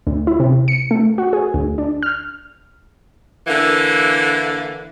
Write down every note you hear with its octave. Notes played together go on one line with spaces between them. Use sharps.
D2
E4
C3
C#7
A3
F#4
G#4
D2
D4
F6
D3 E3 A#3